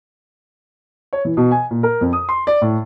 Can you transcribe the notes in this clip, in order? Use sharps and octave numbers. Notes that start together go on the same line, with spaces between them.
C#5
E3
B2
G#5
A#2
A#4
F2
D#6
C6
D5
A2